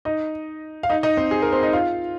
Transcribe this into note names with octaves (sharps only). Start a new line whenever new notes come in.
D#4 D#5
F5
D#4 D#5
D#4 D#5
C4 C5
G#4
A#4
C4 C5
D#4 D#5
F4 F5